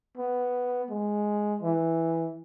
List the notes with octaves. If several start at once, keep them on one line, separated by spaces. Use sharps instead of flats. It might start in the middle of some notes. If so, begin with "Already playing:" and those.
B3
G#3
E3